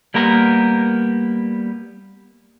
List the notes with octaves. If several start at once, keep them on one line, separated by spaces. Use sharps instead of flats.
G3 A#3 B3 A#4